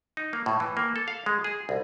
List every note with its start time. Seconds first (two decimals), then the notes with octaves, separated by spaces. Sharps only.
0.17 D#4
0.33 A#3
0.46 A2
0.60 E3
0.77 A#3
0.96 A4
1.08 F5
1.26 G#3
1.44 G#4
1.69 C2